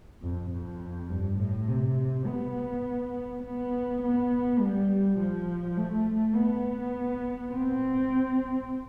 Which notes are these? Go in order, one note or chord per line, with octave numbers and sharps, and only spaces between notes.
F2
F2
G2
A2
C3
B3
B3
B3
G3
F3
A3
B3
C4